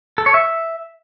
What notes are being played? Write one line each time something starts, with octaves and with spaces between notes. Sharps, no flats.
A4
C#5
E5